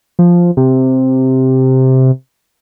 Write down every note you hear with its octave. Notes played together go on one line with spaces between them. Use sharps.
F3
C3